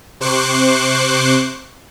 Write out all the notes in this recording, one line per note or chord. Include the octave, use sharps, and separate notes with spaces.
C3 C5 C#6 D6 F#6 C7